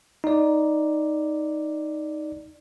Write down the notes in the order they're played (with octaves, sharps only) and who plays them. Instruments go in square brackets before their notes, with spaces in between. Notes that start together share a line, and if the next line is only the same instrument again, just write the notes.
[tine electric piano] D#4 D5